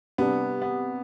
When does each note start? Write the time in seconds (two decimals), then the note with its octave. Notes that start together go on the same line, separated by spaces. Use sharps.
0.18 C3 G3 B3 D4
0.62 B3